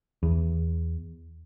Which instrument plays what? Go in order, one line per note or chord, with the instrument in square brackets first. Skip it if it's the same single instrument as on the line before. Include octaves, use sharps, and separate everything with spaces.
[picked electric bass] E2